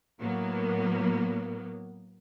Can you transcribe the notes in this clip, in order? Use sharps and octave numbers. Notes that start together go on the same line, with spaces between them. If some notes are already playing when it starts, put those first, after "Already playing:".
A2 F#3 A#3 B3